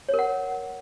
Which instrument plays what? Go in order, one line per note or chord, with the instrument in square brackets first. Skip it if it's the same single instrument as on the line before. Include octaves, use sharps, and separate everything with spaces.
[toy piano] C#5
A#4
F#5